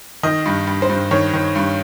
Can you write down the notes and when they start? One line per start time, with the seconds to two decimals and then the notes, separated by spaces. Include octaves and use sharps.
0.23 D#3 D#5
0.46 G2
0.67 G2
0.82 C5
0.89 G2
1.11 D#3 C#5
1.33 D#3
1.55 G2